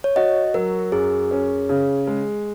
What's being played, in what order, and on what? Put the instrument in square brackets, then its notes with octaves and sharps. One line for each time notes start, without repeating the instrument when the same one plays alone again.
[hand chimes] C#5
[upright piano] F#4 [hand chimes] D#5
[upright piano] F#3 [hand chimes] A#4
[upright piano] F#2 [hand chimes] G#4
[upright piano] C#4
C#3
G#3